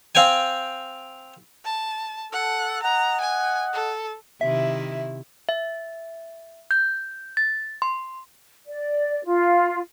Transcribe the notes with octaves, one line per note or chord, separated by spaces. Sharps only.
C4 F5 G5 G#5
A5
A4 F#5
D#5 F#5 A#5
G#5
A4
C3 D#3 E4 E5
E5
G6
A6
C6
D5
F4